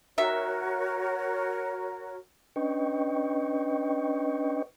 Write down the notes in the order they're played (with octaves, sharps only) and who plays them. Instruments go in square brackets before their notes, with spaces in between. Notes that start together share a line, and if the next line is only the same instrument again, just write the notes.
[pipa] D#3 E5 [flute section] F#4 A#4 C#5
[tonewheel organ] C#4 D4 B4 D#5 G5 C#6